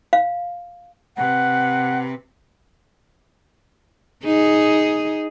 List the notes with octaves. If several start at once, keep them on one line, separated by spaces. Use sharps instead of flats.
F5
C3 B4 F#5
D#4 G#4